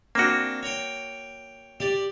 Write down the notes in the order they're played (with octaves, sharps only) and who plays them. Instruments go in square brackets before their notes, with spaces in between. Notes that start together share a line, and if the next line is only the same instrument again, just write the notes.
[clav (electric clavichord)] A#3 F#4 [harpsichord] C4 D4
[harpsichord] C#5 G5
G4 D5